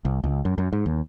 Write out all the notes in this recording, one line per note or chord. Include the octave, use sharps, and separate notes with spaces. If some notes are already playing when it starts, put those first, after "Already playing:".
C2
C#2
F#2
F#2
G#2
D#2